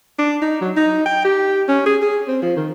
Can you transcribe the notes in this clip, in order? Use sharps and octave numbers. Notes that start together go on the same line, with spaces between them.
D4
D#4
F#3
D#4
G5
G4
C#4
G#4
G#4
C4
F3
D#3